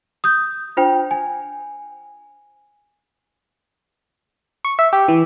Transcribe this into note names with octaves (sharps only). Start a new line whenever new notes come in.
D#6 G6
D4 F4 C5 G5
G#5
C#6
E5
G4
E3